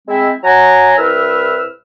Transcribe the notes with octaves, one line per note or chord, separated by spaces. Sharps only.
G#3 C4 E4
F#3 F#5 G#5 A#5
C2 E4 B4 E5 E6 F6